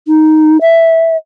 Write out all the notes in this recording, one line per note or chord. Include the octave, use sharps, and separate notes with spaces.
D#4
E5